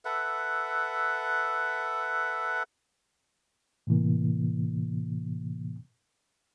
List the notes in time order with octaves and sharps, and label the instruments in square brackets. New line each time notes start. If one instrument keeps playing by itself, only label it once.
[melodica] A4 B4 E5 F#5
[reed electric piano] A2 C3 E3 A#3